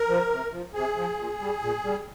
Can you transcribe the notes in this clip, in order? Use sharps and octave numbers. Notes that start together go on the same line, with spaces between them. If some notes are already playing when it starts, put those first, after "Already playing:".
Already playing: A#4
F3
C3
F3
C3 G#4
F3
A#2
G3
A#2
G3